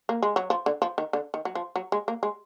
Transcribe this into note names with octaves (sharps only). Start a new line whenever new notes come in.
A#3
G#3
F#3
F3
D3
F3
D#3
D3
D#3
F#3
F3
F#3
G#3
A#3
G#3